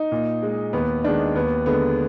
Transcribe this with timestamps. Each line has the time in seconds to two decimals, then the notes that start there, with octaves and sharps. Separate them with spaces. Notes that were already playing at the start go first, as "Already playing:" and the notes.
Already playing: D#4
0.12 A#2
0.43 G#3
0.73 D#2 B3
1.04 D#3 G#3 D4
1.35 D#2 B3
1.66 D3 G#3 B3